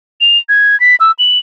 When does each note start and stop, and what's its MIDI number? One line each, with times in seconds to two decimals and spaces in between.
0.21 0.38 101
0.49 0.78 92
0.80 0.96 95
1.00 1.11 88
1.19 1.38 102